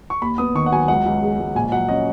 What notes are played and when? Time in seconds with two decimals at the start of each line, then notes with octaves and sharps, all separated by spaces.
0.10 C#6
0.22 D#2 B5
0.38 B3 D#6
0.55 D#3 C#6
0.66 F#5
0.72 F#3 G#5
0.88 C#2 F#5
1.06 C#2
1.22 G#3
1.40 C#2
1.55 A#1 G#5
1.72 F#3 F#5
1.89 C#4 D#5